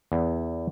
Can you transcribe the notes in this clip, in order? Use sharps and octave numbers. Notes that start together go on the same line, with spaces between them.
E2